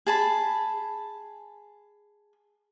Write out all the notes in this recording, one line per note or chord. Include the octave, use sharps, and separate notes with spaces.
G#4 A5 B5